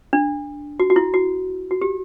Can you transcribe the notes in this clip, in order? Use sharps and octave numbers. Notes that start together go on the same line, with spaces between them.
D4
F#4
F#4
E4
F#4
F#4
G4